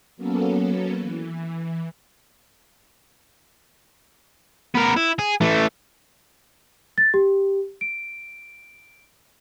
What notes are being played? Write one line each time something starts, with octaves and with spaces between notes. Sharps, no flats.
F#3 A#3 B3 C#4 A4
E3
B3 A#4
E4
G#4
E3 A3
A6
G4
D7